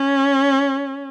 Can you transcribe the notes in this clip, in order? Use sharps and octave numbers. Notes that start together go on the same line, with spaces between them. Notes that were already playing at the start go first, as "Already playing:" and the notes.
Already playing: C#4